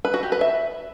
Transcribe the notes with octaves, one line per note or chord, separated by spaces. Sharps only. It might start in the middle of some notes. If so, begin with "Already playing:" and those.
B4
F#4
G4
B4
E5